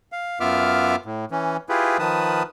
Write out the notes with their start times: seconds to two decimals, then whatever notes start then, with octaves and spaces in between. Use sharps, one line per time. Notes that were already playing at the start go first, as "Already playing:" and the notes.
0.12 F5
0.40 F#2 B3 F4 E5 D6 F6
1.05 A2
1.31 E3 C#4
1.69 E4 F4 G4 G#4 B4
1.99 D#3 F3 B4 A5 D#6